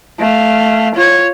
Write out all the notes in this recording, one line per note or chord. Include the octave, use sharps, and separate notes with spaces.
A3 F5
F4 C#5